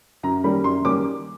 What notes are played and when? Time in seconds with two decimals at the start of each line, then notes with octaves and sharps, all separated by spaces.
0.23 F#2 A#5
0.44 D#3 G3 A#3 C#4 B5
0.64 F#2 C6
0.85 D#3 G3 A#3 C#4 D6